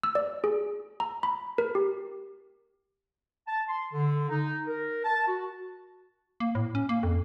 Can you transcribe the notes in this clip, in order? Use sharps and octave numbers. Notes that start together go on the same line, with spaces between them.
E6
D5
G#4
A#5
B5
A#4
G4
A5
C6
D3
D#4
A#4
A5
F#4
A#3
A2
C#4
A#3
F2